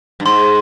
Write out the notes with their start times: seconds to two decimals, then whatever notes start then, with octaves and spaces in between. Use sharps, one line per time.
0.20 G2
0.25 G#2 C6